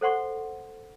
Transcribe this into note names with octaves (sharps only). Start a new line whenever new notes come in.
A4 C5 F#5 C6 C#6